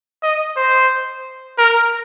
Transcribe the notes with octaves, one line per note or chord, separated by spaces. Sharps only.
D#5
C5
A#4